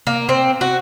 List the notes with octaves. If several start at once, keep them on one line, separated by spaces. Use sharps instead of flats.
A#3
C4
F#4